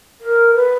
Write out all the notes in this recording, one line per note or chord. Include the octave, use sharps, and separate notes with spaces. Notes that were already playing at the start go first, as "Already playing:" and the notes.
A#4
B4